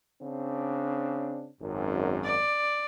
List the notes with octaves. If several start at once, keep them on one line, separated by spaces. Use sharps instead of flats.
C#3 C4 D4
G#1 F#2
D5